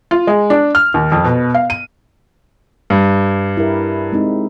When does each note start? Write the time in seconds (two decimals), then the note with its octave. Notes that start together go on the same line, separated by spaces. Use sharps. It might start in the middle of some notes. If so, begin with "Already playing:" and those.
0.11 F4
0.27 G#3
0.50 D4
0.75 F6
0.94 D#2
1.12 F2
1.24 B2
1.54 F5
1.70 D#7
2.90 G2
3.57 E4 G4 A#4
4.13 G#3 C4 D#4